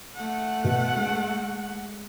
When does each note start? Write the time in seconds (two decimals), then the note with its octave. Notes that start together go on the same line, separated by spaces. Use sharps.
0.16 A3 F#5
0.64 B2
0.96 G#3